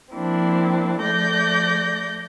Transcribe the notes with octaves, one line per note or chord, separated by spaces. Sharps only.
F3 A#3 C4 D4 E4
F3 A3 D5 G6 A#6